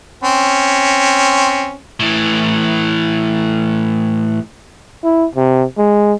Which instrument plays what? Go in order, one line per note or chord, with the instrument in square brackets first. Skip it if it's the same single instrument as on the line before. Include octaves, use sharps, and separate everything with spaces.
[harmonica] C4 C#4
[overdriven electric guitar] A2 E3
[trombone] E4
C3
G#3